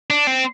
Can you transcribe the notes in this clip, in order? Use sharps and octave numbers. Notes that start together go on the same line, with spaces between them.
D4
C4